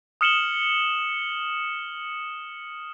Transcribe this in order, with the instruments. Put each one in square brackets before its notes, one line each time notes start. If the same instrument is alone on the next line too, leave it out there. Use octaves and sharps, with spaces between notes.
[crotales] D#6 F6 C#7 E7 F#7 G7